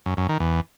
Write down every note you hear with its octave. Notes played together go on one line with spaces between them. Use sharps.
F#2
F#2
D#3
E2